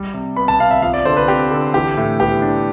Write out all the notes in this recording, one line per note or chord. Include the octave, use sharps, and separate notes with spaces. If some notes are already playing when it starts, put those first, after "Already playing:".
Already playing: G3
C3
B3 B5
A5
C3 F5
E5
F3 F5
D5
D3 C5
B4
C4 G4
D3
E3 G4
A2
B3 G4
D4